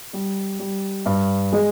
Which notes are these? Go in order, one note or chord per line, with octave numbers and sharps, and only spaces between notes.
G3
G3
G2
G#3